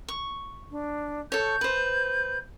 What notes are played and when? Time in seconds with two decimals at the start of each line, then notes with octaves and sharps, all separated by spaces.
0.08 C#6
0.71 D4
1.32 A4 C#5 G6
1.61 B4 C5